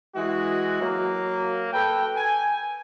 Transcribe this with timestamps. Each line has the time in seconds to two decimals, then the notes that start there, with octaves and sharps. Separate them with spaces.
0.15 E3 G#3 F#4
0.81 F#3 A#3
1.72 A4 B4 G5
2.17 G#5